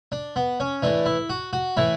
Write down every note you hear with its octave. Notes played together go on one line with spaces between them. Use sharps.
D4
B3
C#4
A2 E3 D4
E4
F#4
F#4
A2 E3 E4